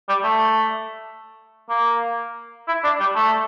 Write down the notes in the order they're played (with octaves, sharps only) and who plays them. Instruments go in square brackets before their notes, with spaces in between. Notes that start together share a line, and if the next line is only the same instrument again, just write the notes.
[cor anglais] G3
A3
A#3
E4
D4
G3
A3